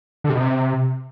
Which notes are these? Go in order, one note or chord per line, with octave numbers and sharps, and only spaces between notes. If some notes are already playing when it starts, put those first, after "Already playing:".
D3
C3
B2
C3